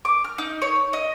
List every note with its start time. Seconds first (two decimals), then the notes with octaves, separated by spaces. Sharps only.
0.05 D6
0.24 F6
0.38 D#4
0.62 C#5
0.93 D#5